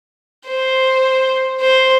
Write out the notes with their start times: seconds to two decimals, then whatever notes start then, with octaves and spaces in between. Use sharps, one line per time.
0.46 C5
1.61 C5